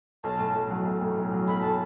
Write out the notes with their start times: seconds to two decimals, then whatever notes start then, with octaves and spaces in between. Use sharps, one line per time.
0.24 B1 A5
0.39 A2
0.55 B1
0.70 F#3
0.85 B1
1.01 A2
1.16 B1
1.32 F#3
1.48 B1 B5
1.61 A2 A5